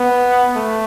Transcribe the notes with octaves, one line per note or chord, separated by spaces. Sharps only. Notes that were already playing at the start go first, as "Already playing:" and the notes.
Already playing: B3
A3